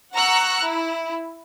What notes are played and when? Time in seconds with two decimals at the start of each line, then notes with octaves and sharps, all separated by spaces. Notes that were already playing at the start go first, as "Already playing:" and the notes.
0.13 F#5 A#5 C#6 E6 F#6
0.62 E4